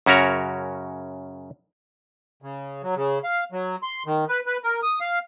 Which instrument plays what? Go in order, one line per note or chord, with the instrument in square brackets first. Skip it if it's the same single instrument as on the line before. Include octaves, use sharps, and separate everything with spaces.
[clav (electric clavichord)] F#2 C#3 C#4 F#4 A#4 C#5
[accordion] C#3
F#3
C#3
F5
F#3
C6
D#3
B4
B4
A#4
D#6
F5